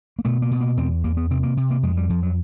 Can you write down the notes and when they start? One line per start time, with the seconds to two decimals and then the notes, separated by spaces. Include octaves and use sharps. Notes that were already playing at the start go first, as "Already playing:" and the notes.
0.19 A#3
0.25 B2 A3
0.42 A#3
0.51 B2
0.61 A#3
0.77 E2 C4
1.04 E2 A#3
1.17 B3
1.31 C3 C4
1.43 A#3
1.57 C3
1.71 A#3
1.83 F2 G#3
1.97 G3
2.09 F2 F3
2.23 F#3